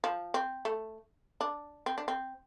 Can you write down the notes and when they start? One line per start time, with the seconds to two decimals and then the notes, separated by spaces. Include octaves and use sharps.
0.04 F3
0.34 C4
0.65 A3
1.41 D4
1.86 C4
1.98 D4
2.08 C4